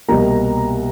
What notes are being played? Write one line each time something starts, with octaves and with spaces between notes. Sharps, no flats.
C2 B2 G3 A#3 A#5